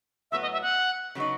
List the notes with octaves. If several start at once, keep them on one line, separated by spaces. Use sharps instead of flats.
A2 F#3 B3 E5
D#5
E5
F#5
C#3 F#3 B3 D#4